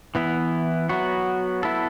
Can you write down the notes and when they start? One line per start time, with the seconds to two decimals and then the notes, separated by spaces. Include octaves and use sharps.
0.15 E3 B3 E4
0.89 F#3 B3 F#4
1.63 B3 E4 A4